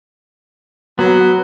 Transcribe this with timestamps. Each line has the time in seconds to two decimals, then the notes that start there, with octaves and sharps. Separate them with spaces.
0.99 F#3 B3